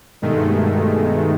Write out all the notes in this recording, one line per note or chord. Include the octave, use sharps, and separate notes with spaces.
G2 B2 D#3 G#3 A3